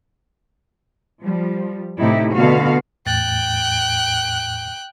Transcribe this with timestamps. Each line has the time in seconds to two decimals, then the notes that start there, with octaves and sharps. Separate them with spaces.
1.22 F3 G3
1.99 A2 C3 D#4 E4 G4
2.35 B2 D3 B3 F#4 F5
3.06 E2 A2 G5 F#6 A6